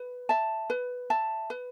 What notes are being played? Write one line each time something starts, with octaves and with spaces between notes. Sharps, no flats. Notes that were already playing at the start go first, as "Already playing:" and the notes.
Already playing: B4
E5 A5
B4
E5 A5
B4